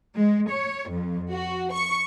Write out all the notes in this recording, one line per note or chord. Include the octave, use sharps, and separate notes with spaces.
G#3
C#5
F2
F#4
C#6